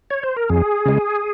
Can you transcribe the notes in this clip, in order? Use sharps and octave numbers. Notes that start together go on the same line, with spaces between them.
C#5
C5
A#4
F2 G#4
C#3 G#3